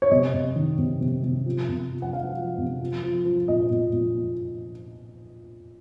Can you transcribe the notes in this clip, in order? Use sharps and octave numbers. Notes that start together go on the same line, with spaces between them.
C#5
C3 D#5
C3
D#3
C3
C3
C3
F3
C3
F3
F#5
F3 F5
F3
C3
F3
F3
F3
A#2 D#5
A#2
A#2